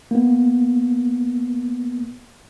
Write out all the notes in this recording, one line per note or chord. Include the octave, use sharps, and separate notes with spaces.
A#3 B3